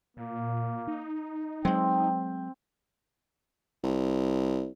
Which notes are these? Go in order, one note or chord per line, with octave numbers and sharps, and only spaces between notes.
A#2 A#3
D#4
F#3 G#3 C4 G5
C2